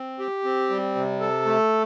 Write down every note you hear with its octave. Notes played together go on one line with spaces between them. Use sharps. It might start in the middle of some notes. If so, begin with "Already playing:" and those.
Already playing: C4
G4
C4
G3
C3
A4
A3